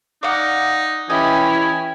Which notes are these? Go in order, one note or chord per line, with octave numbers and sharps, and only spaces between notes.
D#4 D5 F5 F#5
E3 C#4 E4 G4 D#5 G#5